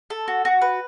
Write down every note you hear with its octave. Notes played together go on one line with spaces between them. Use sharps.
A4
F#4
F#4
B4